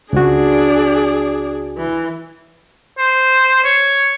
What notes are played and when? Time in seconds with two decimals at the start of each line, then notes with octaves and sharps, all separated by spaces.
0.13 C#2 D4 F#4 G#4
1.78 E3
2.98 C5
3.64 C#5